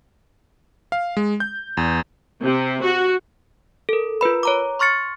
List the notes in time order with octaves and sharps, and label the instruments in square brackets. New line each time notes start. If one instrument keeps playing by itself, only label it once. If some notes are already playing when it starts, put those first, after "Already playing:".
[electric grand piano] F5
G#3
G6
E2
[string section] C3
F#4
[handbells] A4 A#4
F4 A#4 B4 B5
C#5 A#5 D6
C6 C#6 F6 A6 C#7